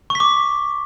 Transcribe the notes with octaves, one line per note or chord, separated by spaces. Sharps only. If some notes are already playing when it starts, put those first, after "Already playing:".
C#6
B6
D6